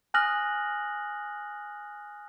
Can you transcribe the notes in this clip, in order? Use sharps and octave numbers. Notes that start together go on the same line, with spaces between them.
G#5 D#6 F6 F#6 A#6 F#7